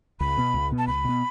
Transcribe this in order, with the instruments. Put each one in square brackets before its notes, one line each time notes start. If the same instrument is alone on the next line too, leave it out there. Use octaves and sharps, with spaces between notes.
[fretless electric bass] C#2 [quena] B5
[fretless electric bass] B2 B3
C#2
B2 B3
[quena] A5
[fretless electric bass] C#2 [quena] B5
[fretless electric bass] B2 B3